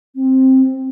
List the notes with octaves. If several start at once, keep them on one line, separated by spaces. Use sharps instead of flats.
C4